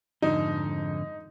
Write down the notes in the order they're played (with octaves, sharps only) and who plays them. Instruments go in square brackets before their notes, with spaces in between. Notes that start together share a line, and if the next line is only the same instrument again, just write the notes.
[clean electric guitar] F2 G#2 D3 [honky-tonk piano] D#4